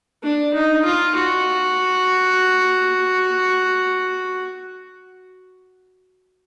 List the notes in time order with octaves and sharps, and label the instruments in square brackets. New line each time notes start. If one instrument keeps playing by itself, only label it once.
[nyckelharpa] D4
D#4
F4
F#4